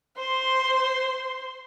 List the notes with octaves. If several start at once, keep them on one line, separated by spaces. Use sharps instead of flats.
C5 C6